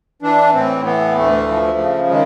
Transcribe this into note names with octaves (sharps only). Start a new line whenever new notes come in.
E3 D4
A2 C4
E3 B3
D2 A3
F3
C#3
D#3 G#3